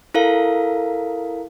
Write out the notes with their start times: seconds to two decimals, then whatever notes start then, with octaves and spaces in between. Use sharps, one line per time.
0.14 E4 A4 A#4 F5